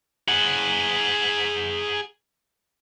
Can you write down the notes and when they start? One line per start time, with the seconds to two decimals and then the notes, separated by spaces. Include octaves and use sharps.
0.28 G#4 F#5